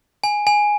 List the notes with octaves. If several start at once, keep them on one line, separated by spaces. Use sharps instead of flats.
G#5
G#5